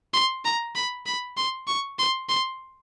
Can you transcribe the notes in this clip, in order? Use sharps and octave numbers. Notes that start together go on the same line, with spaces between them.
C6
A#5
B5
B5
C6
C#6
C6
C6